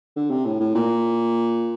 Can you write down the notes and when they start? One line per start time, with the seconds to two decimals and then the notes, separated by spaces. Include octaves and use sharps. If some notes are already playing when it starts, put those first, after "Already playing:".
0.16 D3
0.31 C3
0.45 A2
0.60 A2
0.75 A#2